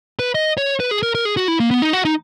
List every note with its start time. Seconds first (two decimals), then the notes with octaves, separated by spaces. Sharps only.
0.19 B4
0.35 D#5
0.57 C#5
0.80 B4
0.91 G#4
1.03 A#4
1.15 A#4
1.25 G#4
1.37 F#4
1.48 E4
1.60 A#3
1.71 B3
1.82 D#4
1.93 F#4
2.05 D#4